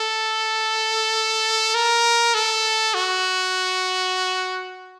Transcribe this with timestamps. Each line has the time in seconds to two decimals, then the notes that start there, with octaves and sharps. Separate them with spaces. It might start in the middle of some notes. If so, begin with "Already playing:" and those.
Already playing: A4
1.75 A#4
2.34 A4
2.94 F#4